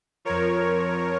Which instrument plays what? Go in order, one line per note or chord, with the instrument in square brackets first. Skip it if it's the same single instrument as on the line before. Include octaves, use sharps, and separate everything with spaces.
[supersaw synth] F2 F3 A#4 C#5